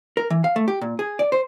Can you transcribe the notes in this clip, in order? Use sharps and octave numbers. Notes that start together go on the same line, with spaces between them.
A#4
E3
F5
A3
G4
A#2
G#4
D5
C5